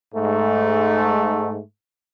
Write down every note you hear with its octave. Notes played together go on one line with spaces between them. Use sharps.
G#2 A3